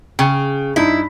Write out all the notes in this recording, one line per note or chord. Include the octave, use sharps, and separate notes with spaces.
C#3 G5
G2 D#4 E4